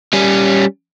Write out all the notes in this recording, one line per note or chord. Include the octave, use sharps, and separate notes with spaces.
G3 C#4